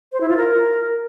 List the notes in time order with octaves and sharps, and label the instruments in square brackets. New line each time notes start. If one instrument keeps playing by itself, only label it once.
[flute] C5
E4
F4
A#4